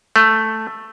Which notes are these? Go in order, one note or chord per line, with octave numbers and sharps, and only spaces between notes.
A3